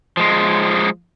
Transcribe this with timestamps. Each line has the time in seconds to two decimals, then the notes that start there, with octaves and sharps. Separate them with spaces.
0.17 F3 G#3